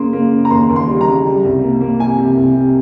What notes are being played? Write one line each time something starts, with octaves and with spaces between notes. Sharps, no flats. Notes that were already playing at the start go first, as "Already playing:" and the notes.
Already playing: C#3 A#3 C6
A#3
C#3
A#5
D#2 C6
D#2
C6
G3
A#5
C#3
G3
C2
A#3
A#3
C3 G#5
C3
C2
C3